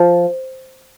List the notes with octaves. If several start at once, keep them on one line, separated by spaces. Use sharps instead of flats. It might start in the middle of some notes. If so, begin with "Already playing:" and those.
Already playing: F3